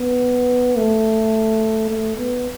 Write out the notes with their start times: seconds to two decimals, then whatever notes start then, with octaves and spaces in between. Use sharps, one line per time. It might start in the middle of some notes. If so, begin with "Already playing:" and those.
Already playing: B3
0.77 A3
1.90 A3
2.18 B3